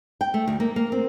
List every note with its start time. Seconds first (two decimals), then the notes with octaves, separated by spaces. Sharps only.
0.21 G5
0.34 A3
0.48 D2
0.60 A#3
0.76 A#3
0.92 C4